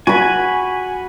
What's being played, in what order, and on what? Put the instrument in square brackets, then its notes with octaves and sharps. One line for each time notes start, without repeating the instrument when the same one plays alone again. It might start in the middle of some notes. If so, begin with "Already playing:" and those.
[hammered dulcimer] F#4 B5 [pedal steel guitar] G#5